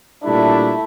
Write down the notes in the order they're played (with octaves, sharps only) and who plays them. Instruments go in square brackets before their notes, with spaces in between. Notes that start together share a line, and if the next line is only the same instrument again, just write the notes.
[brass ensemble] A#2 G3 D4 [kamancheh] A3 E4